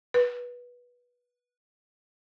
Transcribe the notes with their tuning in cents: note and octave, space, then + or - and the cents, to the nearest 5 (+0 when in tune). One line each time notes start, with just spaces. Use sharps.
B4 -20